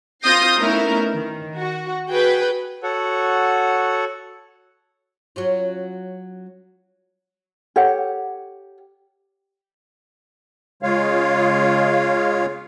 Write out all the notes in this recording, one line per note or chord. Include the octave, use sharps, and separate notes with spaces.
C4 F4 D#6 G6 A#6 C7
A3 B3 C#4 D#4 E4 A#4
D#3
F#4
F#4 G#4 B4 G5
F#4 A4 C#5 F#5
F#3 C#4 F4
G4 A4 C#5 F#5
C#3 G#3 F4 C#5 F5